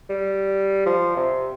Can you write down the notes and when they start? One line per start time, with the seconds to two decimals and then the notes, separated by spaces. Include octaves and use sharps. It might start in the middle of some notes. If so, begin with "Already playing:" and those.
0.09 G3
0.86 F3
1.16 C3